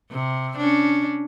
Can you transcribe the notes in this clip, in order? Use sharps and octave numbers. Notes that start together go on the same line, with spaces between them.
C3
C#4 D4